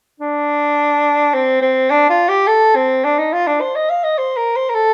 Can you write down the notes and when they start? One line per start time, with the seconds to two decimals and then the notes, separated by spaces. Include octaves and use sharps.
0.20 D4
1.34 C4
1.62 C4
1.91 D4
2.10 F4
2.29 G4
2.47 A4
2.75 C4
3.05 D4
3.19 D#4
3.33 F4
3.47 D4
3.61 C5
3.76 D#5
3.90 F5
4.04 D#5
4.18 C5
4.37 A#4
4.56 C5
4.70 A#4
4.75 A4